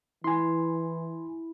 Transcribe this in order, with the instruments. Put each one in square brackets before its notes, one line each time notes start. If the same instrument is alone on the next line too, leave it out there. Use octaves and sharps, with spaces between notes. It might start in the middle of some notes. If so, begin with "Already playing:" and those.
[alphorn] E3 [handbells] E4 [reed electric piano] G#5 C6